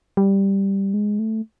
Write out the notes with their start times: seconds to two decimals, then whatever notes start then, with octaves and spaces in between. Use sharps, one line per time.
0.17 G3
0.94 G#3
1.19 A3